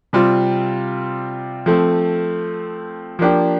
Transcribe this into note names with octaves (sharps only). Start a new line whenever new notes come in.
C3 G3 C4 F4
F3 A3 C4
F3 A#3 D4 G4